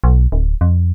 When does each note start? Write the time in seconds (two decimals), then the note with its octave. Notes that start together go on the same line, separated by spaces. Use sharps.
0.04 B1
0.32 D1
0.61 F2